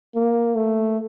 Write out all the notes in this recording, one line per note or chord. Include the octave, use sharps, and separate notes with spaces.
A#3
A3